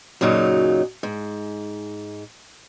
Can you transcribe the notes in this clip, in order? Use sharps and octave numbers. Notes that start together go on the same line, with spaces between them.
F#2 A#2 C#3 F#3 D#4
G#2